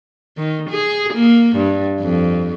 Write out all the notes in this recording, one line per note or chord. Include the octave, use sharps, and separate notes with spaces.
D#3
G#4
A#3
G2
F2